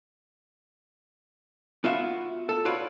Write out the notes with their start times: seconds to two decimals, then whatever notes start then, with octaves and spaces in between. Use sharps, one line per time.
1.84 B3 F4 F#4 E5
2.49 A4
2.65 F4 F#4 B4 C#5 D5